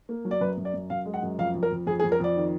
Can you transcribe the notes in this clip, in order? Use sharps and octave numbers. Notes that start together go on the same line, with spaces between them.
A#3
F#3
D5
F#2 B4
F#2
D5
F#2
F#2 F5
G#3
F#5
F#2
F2 F5
F2
A#4
F2
F2 G#4
G#4
F2
A#4
F2 D5
D#3